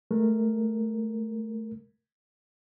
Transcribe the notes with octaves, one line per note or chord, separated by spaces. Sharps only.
G#3 A3 A#4